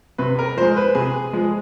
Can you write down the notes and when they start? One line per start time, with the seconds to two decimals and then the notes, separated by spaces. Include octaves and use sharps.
0.18 C3 B4
0.39 A#4
0.57 F3 G#3 C5
0.77 B4
0.95 C3 G#4
1.33 F3 G#3